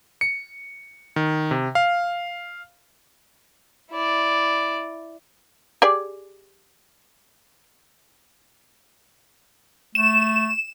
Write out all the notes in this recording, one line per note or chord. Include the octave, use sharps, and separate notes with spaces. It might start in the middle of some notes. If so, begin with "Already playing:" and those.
C#7
D#3
C3
F5
E4 D5
G4 G#4 D5
A3 E7